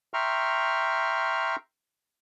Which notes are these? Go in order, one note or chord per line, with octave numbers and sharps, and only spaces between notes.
E5 G5 A#5 C6 C#6 F6